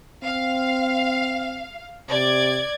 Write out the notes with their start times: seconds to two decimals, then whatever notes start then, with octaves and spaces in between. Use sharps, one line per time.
0.24 C4 F5
2.11 C3 D5 G#6